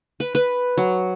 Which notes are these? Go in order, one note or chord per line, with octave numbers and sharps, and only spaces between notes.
B4
B4
F#3